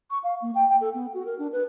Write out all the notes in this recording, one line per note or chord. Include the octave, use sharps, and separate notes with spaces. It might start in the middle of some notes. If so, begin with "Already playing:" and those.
C#6
F5
A#3
G5
G5
A4
B3
F#4
A#4
D4
B4